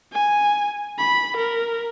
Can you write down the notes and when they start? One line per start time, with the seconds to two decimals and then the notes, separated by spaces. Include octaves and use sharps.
0.12 G#5
0.98 B5
1.37 A#4